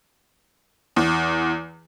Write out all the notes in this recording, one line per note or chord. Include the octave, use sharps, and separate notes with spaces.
E2